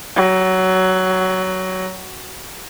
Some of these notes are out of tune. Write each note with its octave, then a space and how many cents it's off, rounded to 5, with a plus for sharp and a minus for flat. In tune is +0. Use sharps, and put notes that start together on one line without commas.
F#3 +15